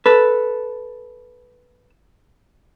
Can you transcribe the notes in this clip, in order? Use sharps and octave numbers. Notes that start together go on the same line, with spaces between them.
A4 B4